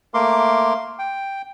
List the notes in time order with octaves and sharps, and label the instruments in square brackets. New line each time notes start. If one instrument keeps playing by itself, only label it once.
[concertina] A3 A#3 A#4 C6 D6
G5